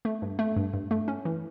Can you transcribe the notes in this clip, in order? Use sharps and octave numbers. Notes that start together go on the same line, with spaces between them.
A3
G2
A3
G2
G2
A3
C#4
E3